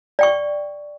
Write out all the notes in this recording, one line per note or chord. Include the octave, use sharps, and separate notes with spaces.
D5 G5 C#6